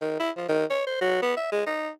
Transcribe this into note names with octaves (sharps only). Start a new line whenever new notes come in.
D#3
E4
F3
D#3
C#5
C5
F#3
B3
E5
G#3
D#4